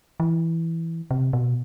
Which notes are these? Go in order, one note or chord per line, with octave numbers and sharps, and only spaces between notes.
E3
C3
B2